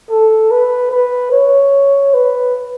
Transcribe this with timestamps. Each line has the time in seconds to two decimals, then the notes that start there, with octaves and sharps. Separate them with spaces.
0.10 A4
0.51 B4
0.91 B4
1.32 C#5
2.14 B4